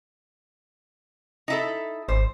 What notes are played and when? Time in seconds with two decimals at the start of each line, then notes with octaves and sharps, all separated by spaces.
1.48 D#4 E4 A4
2.08 G#1 C5